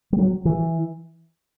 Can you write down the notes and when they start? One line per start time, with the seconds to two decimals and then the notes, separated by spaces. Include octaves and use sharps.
0.13 G3
0.19 F#3
0.45 E3